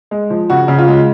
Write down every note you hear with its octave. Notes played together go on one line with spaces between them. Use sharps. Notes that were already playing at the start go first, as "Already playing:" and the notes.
G#3
F3
C#3 F#4
C#3
F4
G#3